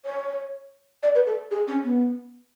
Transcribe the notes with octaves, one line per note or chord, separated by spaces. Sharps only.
C#5
D5
B4
A4
G#4
C#4
B3